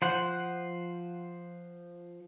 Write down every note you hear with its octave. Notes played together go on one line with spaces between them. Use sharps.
F3 C5 F#5